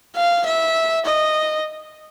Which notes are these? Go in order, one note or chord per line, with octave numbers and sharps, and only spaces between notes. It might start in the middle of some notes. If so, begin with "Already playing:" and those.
F5
E5
D#5